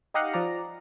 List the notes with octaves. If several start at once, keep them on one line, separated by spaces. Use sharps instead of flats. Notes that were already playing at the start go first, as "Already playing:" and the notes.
D#4 G4 D#5 F5 F#5
F3 D5 A#5